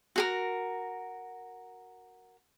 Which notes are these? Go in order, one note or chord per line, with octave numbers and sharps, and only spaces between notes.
F#4 G#4 A#4